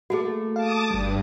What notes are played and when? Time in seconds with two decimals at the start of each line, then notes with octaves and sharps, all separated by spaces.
0.10 A3 A#3 F#4 G#4
0.56 F5 A5 D6 D#6
0.91 G1 G2 G3